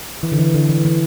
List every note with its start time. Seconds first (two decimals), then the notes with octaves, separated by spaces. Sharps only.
0.23 E3
0.32 D3
0.38 E3
0.54 D3
0.69 E3
0.85 E3